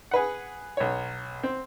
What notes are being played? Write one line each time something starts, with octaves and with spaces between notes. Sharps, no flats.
G#4 B4 F#5
B1 C#5
C4